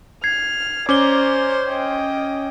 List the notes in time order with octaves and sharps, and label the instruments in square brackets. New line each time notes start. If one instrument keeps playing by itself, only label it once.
[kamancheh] F6 [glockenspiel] G#6 C7
[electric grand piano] C#4 [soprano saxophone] C5 [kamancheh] D5 A#5 [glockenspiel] D6 G7
[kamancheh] D#5 G5